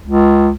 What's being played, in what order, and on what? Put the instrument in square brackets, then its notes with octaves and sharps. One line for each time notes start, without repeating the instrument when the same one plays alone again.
[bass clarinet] C#2